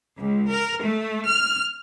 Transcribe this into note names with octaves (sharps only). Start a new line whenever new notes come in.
C#2
A#4
A3
F6